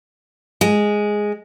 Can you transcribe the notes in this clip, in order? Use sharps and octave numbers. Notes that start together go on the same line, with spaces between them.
G#3